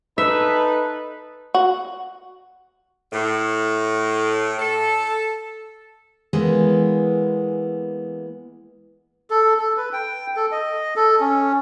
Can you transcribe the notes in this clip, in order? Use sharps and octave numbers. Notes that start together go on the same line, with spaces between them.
D#4 A4 B4 E5
F#4
A2
A4
E3 G#3 A#3 B3
A4
A4
B4
G5
A4
D#5
A4
C#4